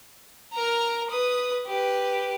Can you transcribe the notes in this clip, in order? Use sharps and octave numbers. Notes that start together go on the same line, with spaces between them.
A#4 A#5
B4 D#6
G4 B4